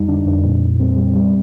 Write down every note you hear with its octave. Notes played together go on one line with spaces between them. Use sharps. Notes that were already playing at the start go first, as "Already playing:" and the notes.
Already playing: F2 G3 D#4
D3 D4
F2
A#2
A#2
G3 C4
G3
G3